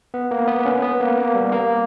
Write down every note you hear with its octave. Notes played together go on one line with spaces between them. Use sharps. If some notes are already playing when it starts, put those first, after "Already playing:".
B3
A#3
B3
C#4
B3
A#3
A#3
G3
A#3